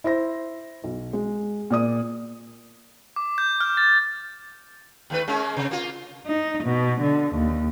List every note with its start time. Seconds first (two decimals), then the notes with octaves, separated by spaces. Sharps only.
0.04 E4 C5 A#6
0.84 B1
1.13 G#3
1.70 A#2 D5 D#6
3.16 D6
3.38 G6
3.61 F6
3.77 A6
5.10 D#2 A3 B4
5.28 G#3 A#3 C#4
5.56 C3
5.71 A#3 F4
6.26 D#4
6.63 B2
7.00 D3
7.35 D#2